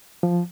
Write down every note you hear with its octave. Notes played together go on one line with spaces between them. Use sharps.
F3